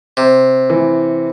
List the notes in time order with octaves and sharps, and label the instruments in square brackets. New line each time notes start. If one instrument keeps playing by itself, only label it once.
[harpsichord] C3
[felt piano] E3